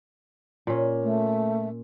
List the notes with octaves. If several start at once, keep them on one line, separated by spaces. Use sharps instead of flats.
A#2 C#4
A3